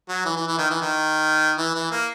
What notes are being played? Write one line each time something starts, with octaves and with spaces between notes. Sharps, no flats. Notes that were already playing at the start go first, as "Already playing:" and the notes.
F#3
E3
E3
E3
D#3
E3
D#3
E3
E3
A#3